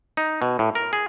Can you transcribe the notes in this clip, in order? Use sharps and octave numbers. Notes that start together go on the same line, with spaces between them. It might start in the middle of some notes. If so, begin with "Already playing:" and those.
D#4
B2
A2
A#4
G#4